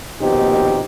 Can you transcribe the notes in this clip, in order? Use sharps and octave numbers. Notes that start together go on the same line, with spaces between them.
A#1 D#2 B2 C4 D#4 G4